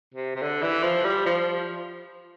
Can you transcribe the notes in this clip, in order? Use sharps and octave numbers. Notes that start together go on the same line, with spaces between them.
C3
C3
D3
E3
F3
G3
F3